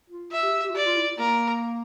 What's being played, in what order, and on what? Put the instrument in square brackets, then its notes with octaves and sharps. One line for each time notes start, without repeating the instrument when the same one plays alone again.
[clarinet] F4
[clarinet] F4 [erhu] E5
[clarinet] G4
G4
G4
F4
[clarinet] G4 [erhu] D5
[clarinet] F4
E4
[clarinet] A#3 [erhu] A#4